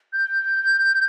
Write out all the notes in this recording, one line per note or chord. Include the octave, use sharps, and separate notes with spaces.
G6